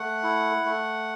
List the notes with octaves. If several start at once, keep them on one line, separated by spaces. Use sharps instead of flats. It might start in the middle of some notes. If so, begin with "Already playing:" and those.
Already playing: A3 F#5
E4
A3